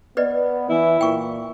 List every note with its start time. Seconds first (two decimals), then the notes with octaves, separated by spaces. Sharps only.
0.17 B3 B4 D5 D#5
0.70 E3 E4
1.01 A#2 G5 C#6